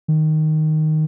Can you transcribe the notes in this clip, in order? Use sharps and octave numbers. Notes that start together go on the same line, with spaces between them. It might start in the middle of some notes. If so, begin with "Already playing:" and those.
D#3